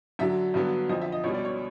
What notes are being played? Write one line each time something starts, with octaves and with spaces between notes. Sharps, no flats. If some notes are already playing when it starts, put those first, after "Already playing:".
F#2 D3 F#3 E5
G2 D3 F#3 B3
F2 D3 F3 D#5
E5
D#5
C#2 B2 G3 C#5
D5
C#5